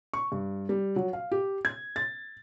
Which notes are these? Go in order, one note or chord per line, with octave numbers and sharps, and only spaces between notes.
C#6
G2
G3
F#3
F5
G4
G#6
A6